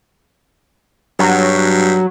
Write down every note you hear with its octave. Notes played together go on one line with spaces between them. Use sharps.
G2 F#3